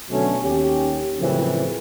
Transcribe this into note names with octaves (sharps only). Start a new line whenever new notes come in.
B2 D3 F#3 A3 C#4
D#2 C#4 G4
F#2 A2 C#3 E3 F3 C4